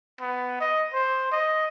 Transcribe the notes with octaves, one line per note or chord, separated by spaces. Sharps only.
B3
D#5
C5
D#5